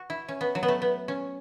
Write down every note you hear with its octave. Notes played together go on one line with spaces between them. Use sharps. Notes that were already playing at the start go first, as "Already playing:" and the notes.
Already playing: F#4
E4
C#4
B3
F#3
B3
A3
B3
C#4